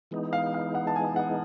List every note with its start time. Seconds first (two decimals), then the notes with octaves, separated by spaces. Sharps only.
0.11 E3 G#3 B3 D#4
0.33 F5
0.54 F5
0.75 F#5
0.87 A5
0.96 G#5
1.16 F#5